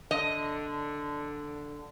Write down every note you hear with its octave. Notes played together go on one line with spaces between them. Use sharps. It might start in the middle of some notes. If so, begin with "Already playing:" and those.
D3 D#5